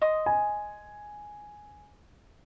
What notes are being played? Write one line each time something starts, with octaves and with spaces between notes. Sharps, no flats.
D#5 C6 D#6
G#5